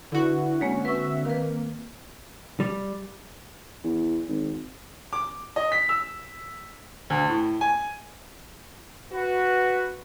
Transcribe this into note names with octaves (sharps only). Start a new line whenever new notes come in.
D3 E4 F#4 B4
G#3 A#3 C4 C#4
B4 E5 C#6
D#3 A#3 B4
G3
E2
G#1
D6
D#5
B6
E6
D2
A2
G#5
F#4 B4